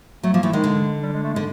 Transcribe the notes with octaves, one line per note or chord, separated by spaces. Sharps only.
F#3 A3
F3 A#3
E3 A3
D#3 G#3
D3
G3
G#3
A3
G#3
D3